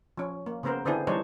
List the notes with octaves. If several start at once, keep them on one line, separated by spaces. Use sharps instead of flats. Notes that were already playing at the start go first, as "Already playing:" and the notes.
F3 C#4
A#3
C#3 A#3 B3 A#4 C5
D3 B3 C4 D4 E4 G#4
E3 G3 D4 D#4 C5 C#5